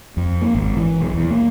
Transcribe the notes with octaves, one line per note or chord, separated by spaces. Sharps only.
F2
A#3
G#1
E3
B1
E2
A#3